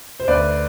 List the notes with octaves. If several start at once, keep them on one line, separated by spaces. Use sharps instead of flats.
C5
D2 B4 D5